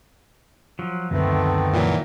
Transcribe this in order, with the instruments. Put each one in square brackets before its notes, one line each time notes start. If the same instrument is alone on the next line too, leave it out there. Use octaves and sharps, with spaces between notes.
[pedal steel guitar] F3 F#3
[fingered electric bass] C#2 F#2 D3 [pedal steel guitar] D#3 [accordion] A3 B3 C4
[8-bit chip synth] A#2 E3 F#3